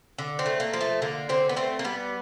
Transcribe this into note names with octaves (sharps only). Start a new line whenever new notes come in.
D3
C4
A3
A#3
F3
A3
D3 A#3
D3 C4
B3
A3 C4
A#3
G3 B3